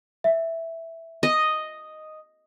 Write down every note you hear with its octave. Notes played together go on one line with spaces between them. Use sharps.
E5
D#5